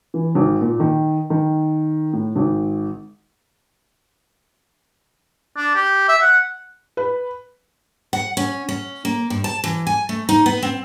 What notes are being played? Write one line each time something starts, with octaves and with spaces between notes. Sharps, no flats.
E3
G#1
A#2
D#3
D#3
A2
G#1
D4
G4
E5
F#5
B4
F#5
C#4
C#4
A#3
G2
A5
E3
G#5
A3
D#4
B3
C4